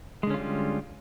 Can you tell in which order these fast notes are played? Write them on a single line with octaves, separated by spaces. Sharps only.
G#3 D3 C#4 F4 G3